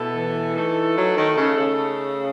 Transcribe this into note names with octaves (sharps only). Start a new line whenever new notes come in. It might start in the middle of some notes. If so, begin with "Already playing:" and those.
Already playing: B2 A3 E4 A4
E3
A3 D#4 A4
F#3
D#3
C#3
C#3